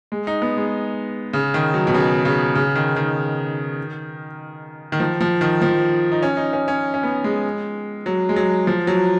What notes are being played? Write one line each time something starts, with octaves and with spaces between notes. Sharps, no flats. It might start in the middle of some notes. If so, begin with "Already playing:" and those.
G#3
D#4
B3
G#3
C#3
D#3
F#3
B2
C#3
C#3
C#3
D#3
D#3
D#3
F3
F3
D#3
F3
D#4
C#4
D#4
C#4
C#4
C#4
B3
G#3
F#3
G#3
F#3
F3
F#3